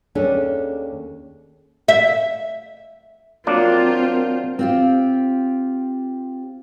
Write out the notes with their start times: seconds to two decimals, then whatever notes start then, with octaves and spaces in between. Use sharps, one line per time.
0.15 D#2 C#4 D4 G#4 A4
1.88 E5
3.47 F#3 A#3 C4 D4 F4 A#4
4.59 C4 F4 G4